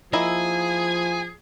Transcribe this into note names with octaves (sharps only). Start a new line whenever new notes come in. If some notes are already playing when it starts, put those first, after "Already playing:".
F3 A#3 E4 G#4 D#5 G#5